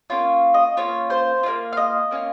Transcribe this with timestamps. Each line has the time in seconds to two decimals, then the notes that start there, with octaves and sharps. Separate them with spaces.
0.10 A#3 C#4 F4 C#5
0.54 D#5
0.77 A#3 C#4 F4 C#5
1.10 C5
1.43 A#3 C#4 F4
1.73 F5
1.77 D#5
2.11 A#3 C#4 F4